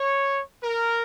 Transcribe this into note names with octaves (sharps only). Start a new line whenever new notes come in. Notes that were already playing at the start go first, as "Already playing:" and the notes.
Already playing: C#5
A#4